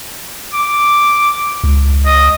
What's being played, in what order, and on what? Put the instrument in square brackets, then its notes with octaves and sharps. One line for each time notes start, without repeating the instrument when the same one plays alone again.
[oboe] D6
[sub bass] C#2
[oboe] D#5